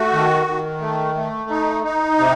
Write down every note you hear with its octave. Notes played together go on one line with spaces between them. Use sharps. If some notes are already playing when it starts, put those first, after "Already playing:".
Already playing: A3 F#4
D#3
D#3
A3
A3
D#4
D#4
C3